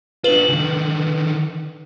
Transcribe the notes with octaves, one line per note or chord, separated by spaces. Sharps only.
D4 F4 B4 F#7
D3 D#3